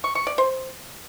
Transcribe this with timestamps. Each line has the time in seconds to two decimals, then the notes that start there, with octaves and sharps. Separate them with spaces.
0.04 C#6
0.15 C#6
0.27 D5
0.38 C5